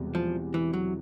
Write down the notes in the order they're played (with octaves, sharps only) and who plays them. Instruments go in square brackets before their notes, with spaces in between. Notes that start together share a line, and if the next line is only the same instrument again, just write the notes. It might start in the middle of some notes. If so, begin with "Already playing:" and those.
Already playing: [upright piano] E1 E2 C3 E3 G3
[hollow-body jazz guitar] F3
E3
F#3